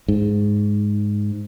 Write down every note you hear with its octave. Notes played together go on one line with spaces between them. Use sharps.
G#2